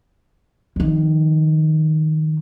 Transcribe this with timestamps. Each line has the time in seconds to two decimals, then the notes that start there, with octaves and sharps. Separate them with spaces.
0.76 F2 D#3